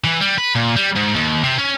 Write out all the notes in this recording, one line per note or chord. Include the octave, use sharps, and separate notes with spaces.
E3
G3
B4
A#2
G3
G#2
D#2
C3
C#4